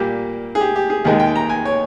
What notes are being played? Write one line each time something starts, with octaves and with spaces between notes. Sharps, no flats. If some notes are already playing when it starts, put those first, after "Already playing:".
Already playing: A#2 G3 A#3 G4
G#4
G4
G4
G#4
D#2 D#3 G#3 G#4
G5
A#5
G#5
C#5